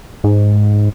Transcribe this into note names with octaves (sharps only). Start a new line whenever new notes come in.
G#2